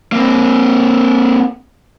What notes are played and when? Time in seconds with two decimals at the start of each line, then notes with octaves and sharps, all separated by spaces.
0.12 A#3 C4